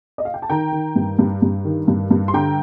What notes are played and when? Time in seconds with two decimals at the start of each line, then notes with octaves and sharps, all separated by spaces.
0.18 D#5
0.25 F5
0.34 G5
0.42 A5
0.50 D#3 G5 A#5
0.72 D#3
0.96 G2
1.19 G2
1.42 G2
1.65 D#3
1.88 G2
2.11 G2
2.28 C6
2.34 D3 G5 A#5